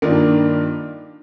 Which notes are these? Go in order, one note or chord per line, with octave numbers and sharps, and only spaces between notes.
G2 D#3 A#3 D4 F4